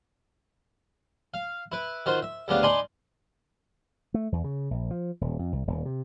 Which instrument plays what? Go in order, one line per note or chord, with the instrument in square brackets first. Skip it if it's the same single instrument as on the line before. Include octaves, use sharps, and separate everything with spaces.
[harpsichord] F5
E4 B4
D#3 F4 F#4 C5
E5
D2 C#3 B3 D4 G4 F5
D#4 D5 G#5 A5 B5 C6
[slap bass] A3
E2
C#3
A#1
F3
D#1
F2
C2
D#1
C3